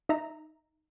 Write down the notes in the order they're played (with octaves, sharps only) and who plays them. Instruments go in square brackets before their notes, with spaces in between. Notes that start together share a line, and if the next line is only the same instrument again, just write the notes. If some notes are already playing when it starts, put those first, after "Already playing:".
[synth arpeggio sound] D#4 E5 A#5